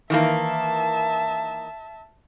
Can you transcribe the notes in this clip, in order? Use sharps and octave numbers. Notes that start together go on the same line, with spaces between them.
D#3 E3 A#3 E5 A5